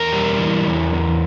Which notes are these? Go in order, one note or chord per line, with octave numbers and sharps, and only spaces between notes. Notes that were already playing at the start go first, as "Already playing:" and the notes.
Already playing: E2 A#4
G3
E3
E2
E2